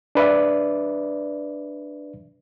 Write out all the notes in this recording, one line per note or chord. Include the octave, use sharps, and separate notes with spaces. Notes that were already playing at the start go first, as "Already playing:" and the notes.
D4 B4 D5 E5